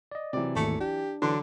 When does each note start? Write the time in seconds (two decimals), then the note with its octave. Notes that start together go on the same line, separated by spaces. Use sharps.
0.11 D5 D#5
0.33 C3 E3 F#3 C4 D5
0.56 G#1 D#2 A3 C#7
0.80 D4 G4
1.22 D3 E3 F#3 D4 C6